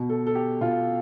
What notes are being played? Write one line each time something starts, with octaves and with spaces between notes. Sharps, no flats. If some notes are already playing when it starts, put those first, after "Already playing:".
Already playing: B2
A4
A4
G4
B2 F4